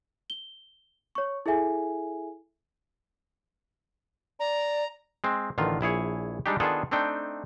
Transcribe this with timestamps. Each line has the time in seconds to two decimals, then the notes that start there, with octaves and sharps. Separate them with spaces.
0.30 G7
1.15 C#5 C#6
1.46 E4 G#4 A4 E5 G#5
4.40 D5 A#5
5.24 G#3 C4
5.58 A1 D3 D#3 F4
5.81 A#1 E4 G#4 C#5
6.46 G3 G#3 D4 D#4 G4
6.60 D#3 B3 D4 F4 G#4 A4
6.91 A3 C4 D4 D#4 G5